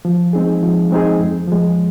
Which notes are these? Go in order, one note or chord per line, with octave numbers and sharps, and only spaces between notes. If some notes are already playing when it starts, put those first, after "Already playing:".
F3
G#3 C4 D#4 G#4
F3
G#3 C4 D#4 G#4
F2
F3 G#3